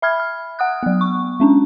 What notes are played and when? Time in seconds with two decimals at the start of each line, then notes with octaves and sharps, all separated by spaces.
0.02 E5 B5 F6 G#6
0.20 F6
0.59 F#5 D#6 F#6
0.83 F#3 B3
1.01 C#6
1.40 G#3 C#4 D4